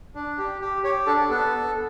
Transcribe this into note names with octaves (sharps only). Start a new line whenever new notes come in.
D4
G4
G4
G4 C#5
D4 A4
B3 A4